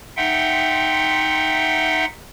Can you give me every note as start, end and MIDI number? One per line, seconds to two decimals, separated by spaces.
0.17 2.05 63
0.17 2.05 76
0.17 2.05 78
0.17 2.05 79
0.17 2.05 84